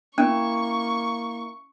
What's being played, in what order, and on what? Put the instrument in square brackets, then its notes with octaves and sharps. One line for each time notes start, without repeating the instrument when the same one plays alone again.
[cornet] A#3 [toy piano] C#4 [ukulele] E4 [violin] C#6